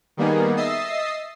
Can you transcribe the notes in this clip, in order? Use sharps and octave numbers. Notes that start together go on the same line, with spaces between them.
D#3 G3 A#3 B3 D#4 G#4
D#5 E5 D#6 E6 A6 C7